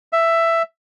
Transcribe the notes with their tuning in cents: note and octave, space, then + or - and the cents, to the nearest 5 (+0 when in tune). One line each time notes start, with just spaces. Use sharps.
E5 +10